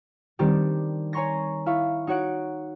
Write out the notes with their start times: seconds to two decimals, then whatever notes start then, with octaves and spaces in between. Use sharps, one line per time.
0.39 D#3 G3 C4 D4 D#4 G4
1.13 C#5 G#5 A#5 C6 C#6 A#6
1.66 E4 E5 F5 C#6
2.07 D#4 F#4 C#5 F#5 D7